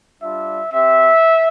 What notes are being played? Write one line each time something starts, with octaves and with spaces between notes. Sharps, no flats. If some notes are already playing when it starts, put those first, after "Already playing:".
G3 D4 F4 E5
C4 G4 E5